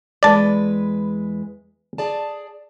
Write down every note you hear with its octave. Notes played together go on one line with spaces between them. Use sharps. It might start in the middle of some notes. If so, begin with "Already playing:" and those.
E2 G#3 B4 D5 A5
G#4 D5 A5